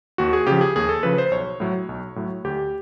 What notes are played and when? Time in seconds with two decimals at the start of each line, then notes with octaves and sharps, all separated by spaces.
0.18 D#2 F#4
0.33 G#4
0.47 C#3 F3 G4
0.61 G#4
0.76 D#2 G#4
0.89 A4
1.03 C#3 F3 B4
1.18 C5
1.31 B1 C#5
1.60 A2 F#3
1.89 B1
2.16 A2 F#3
2.44 D2 G4